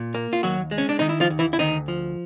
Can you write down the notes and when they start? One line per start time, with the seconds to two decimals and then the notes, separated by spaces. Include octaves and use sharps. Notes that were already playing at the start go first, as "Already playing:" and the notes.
Already playing: A#2
0.14 A#3
0.33 F4
0.43 D#2 F#3 F#4
0.71 G#3
0.78 C#4
0.89 D4
0.99 D#3 D#4
1.09 E4
1.20 F3 F4
1.30 D#2
1.39 E3 E4
1.53 E4
1.59 D2 D#3 D#4
1.88 F3